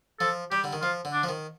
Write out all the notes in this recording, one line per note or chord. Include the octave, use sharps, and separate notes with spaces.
F3 A4
G3 G4
D3
D#3
F3 F4
D3
D4
F3
D#3